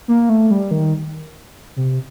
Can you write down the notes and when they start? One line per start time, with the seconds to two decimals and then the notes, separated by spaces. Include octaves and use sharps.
0.08 A#3
0.29 A3
0.51 G3
0.71 D#3
1.77 C3